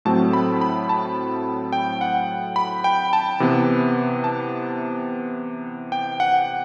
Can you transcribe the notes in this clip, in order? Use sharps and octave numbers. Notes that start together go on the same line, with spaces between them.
A2 F#3 A3 C4 A5
B5
B5
A5
G5
F#5
B5
G5
A5
C3 E3 B3
A5
G5
F#5